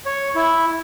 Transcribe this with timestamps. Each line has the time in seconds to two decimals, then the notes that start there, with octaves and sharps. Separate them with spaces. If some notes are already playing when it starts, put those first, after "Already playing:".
0.06 C#5
0.35 E4